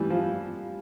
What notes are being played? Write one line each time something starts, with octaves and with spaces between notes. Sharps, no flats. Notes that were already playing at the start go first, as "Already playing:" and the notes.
Already playing: E3 G3
F3